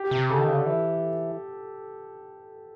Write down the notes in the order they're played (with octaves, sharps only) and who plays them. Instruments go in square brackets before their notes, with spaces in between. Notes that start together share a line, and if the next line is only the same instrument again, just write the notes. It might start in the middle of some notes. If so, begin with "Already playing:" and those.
Already playing: [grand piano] G4
[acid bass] C3
[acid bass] C#3 [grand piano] A4
[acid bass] D#3
C#3
D3
E3